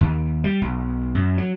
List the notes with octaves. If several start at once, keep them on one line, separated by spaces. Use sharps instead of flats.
D#2
G3
B1
F#2
F#3